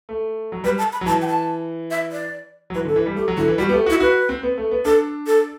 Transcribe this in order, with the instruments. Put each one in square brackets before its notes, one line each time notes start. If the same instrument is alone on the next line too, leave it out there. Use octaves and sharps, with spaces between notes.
[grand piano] A3
F#3
[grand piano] G3 [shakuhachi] B4
[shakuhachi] A5
B5
[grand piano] F#3
[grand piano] E3 [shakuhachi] A5
[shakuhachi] G5
A5
E5
D5
[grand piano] F#3
[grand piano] E3 [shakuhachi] B4
[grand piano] D3
[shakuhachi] A4
[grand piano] E3
G3
[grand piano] A3 [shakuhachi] G4
[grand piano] F#3
[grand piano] D3 [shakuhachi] E4
[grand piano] E3
[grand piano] G3 [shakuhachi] F#4
[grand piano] B3 [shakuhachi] G4
[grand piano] A3
[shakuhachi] E4 [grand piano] F#4
[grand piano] F#4 [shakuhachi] B4
[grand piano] C4
B3
A3
B3
[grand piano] D4 [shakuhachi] A4
[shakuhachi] A4